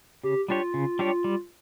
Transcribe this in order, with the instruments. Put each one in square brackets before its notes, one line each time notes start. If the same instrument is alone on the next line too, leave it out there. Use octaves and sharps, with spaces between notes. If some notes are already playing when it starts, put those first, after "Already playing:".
[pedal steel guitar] C#3 [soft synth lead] G4
[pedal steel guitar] G3 D4 G4 C#5 [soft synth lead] F4
[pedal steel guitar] C#3
G3 D4 G4 C#5
G3